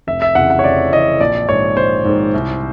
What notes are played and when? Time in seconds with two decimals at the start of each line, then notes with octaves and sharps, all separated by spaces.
0.07 F1 E5
0.22 E5
0.35 F2 C#3 E3 F#5
0.50 F#5
0.59 C#5
0.64 F1 D5
0.92 F2 C#3 E3 D#5
1.21 A#1 D5
1.49 G#2 D#3 C#5
1.77 A#1 C5
2.05 G#2 D#3
2.34 C2